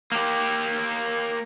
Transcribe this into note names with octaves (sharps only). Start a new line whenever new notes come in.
A#3 G4